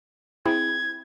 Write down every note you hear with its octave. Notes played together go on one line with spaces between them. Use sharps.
C4 E4 G#4 G#6